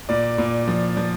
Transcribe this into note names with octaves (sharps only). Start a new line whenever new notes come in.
A#2 D5
A#2
F3
F3